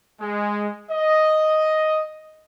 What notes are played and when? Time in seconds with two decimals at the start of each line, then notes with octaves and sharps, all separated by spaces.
0.21 G#3
0.91 D#5